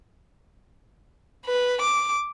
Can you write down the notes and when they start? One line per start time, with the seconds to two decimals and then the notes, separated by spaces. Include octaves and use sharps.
1.46 B4
1.81 D6